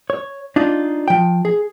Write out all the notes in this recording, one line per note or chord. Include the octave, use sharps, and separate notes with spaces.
C#5
D4 D#4 F4
F3 G5
G#4